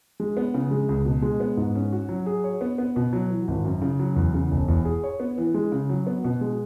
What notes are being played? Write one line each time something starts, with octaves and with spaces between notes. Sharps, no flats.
G#3
B3
C#3
G#3
C#2
B2
G#3
B3
G#2
C#4
F#4
F#3
G#4
C#5
B3
B3
B2
F#3
E3
G#1
F#2
C#3
F#3
E2
C#3
E1
E2
G#4
C#5
B3
E3
G#3
C#3
F#3
B3
B2
G#3